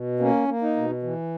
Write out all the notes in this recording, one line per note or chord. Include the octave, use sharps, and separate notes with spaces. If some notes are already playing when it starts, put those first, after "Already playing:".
Already playing: B2
A#3 C#4
A#3
D#4
B2
E3